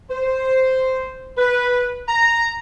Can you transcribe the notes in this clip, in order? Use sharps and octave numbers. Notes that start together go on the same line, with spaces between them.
C5
B4
A#5